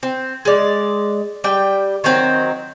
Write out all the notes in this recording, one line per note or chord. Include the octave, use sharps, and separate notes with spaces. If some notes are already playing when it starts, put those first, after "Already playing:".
C4
G#3 D5
G3 G5
D#3 F#3 C4